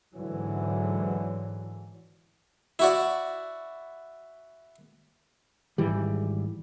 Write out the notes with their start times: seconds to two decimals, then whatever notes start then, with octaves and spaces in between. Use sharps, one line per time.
0.15 G#2 D3 E3 F#3
2.79 E4 F#4 D5
5.78 G#1 E3 G3